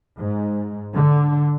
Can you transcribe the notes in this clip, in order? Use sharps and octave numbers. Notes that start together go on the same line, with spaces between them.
G#2
D3